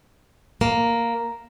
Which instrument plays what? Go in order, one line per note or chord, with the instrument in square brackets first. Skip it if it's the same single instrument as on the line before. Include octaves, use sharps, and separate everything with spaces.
[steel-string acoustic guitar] A#3 [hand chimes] A#5